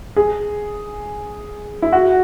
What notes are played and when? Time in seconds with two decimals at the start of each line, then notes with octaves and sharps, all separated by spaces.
0.16 G#4
1.82 E4
1.92 F#4